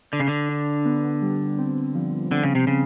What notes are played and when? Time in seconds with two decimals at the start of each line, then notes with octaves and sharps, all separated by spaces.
0.12 D3 D4
0.20 C#3
0.28 D3
0.49 D4
0.85 B3
1.22 G3
1.58 C4
1.95 F3
2.31 D3 C4
2.44 C#3
2.55 C3
2.67 C#3 C4